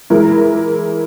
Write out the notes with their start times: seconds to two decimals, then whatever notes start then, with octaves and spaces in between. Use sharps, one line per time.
0.10 E3 G#3 E4 A#4